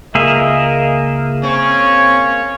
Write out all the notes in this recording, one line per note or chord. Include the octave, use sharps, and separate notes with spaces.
C#2 A#3 G#4 A#4 D#5 E5
C4 C#4 C#5